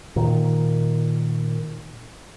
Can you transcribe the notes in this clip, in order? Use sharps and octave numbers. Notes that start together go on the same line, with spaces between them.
A#2 D#3